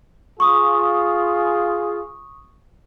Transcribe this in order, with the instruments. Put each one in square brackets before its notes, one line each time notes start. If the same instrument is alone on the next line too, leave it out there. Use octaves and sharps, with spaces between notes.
[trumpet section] F4 G#4 [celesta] C#6 D#6